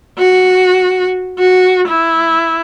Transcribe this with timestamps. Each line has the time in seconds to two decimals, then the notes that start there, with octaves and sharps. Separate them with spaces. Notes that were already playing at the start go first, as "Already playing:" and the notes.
0.18 F#4
1.39 F#4
1.88 E4